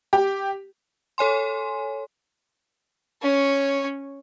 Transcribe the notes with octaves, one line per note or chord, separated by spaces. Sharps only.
G4
A4 C#5 G#5 C6
C#4 C#5